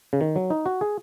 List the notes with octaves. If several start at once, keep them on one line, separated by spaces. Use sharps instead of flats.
C#3
D#3
F#3
D#4
F#4
G#4